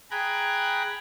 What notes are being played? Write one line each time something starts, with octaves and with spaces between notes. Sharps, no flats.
G#4 G5 A#5 B5 F#6 G#6